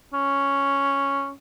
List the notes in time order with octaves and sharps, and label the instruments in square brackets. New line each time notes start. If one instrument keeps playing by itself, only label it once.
[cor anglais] C#4